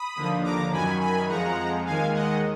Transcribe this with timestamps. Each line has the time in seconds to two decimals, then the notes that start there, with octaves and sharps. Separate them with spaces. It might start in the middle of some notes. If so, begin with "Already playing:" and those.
Already playing: B5 D#6
0.16 D#2 D3 F3
0.43 A#5 D6
0.72 F#2 D#3 F#3 G#5 B5
1.01 G#5 B5
1.28 F2 F3 G#3 F#5 A#5
1.86 D#2 D#3 G#3 F5 G#5
2.14 D#5 F#5